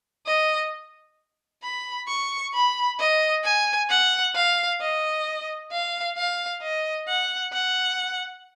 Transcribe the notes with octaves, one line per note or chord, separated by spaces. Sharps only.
D#5
B5
C#6
B5
D#5
G#5
F#5
F5
D#5
F5
F5
D#5
F#5
F#5